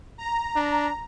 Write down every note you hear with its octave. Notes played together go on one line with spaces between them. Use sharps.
A#5
D4